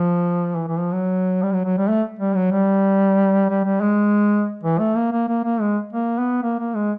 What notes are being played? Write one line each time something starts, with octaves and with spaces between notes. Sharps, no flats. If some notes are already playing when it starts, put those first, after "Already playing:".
Already playing: F3
E3
E3
F3
F#3
G3
F#3
F#3
G3
A3
G3
F#3
G3
G3
G3
G#3
E3
A3
A#3
A#3
A#3
A#3
G#3
A#3
B3
A#3
A#3
G#3